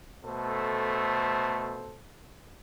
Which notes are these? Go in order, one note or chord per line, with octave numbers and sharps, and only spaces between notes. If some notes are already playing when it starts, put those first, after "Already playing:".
B2 A3 A4 C5